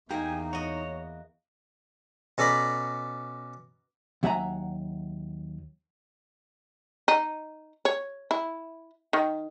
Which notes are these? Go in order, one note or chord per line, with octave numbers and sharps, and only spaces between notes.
E2 A#3 D#4 G4 G#5
F#4 C#5 D#5
B2 C#4 A4 D5 A#5 B5
D#2 F#3 E5 F#5 G#5 A#5
D#4
C#5
E4
D#3